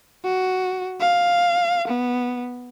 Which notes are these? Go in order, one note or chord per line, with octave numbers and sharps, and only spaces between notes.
F#4
F5
B3